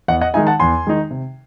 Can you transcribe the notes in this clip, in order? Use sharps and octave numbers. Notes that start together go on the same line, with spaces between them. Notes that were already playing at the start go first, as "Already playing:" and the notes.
E2 D#5 F#5
D#5 F#5
D#3 G#3 D#4 E5 G#5
F#5 A5
E2 G#5 C6
D#3 G#3 D#4
C3